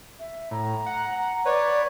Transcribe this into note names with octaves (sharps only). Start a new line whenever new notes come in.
E5
A2 A#5
F#5
B4 C#5 D5